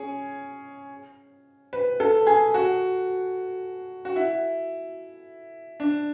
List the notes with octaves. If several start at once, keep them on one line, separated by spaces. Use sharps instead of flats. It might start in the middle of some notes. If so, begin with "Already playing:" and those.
Already playing: C#4 G#4
B4
A4
G#4
F#4
F#4
E4
D4